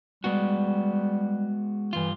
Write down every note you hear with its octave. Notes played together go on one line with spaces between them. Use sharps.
G3 G#3 B3 F#4
G2 E3 F4